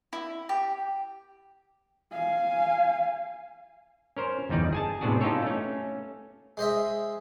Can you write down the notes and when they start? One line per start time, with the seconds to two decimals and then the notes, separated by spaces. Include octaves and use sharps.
0.13 E4
0.49 G4
2.12 F5 G#5
4.17 C#4 A#4 C5
4.49 G1 E2 G3 D#4 D5
4.73 G#4 G#5 A5
5.01 A2 C3 B3 D4 F#4 G#4
5.21 C#4 D#4 F4 G4 A4 C#5
5.42 A3 C#4
6.57 G#3 C5 D#5 E5